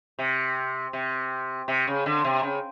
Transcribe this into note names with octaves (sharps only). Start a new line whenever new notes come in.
C3
C3
C3
C#3
D3
C3
C#3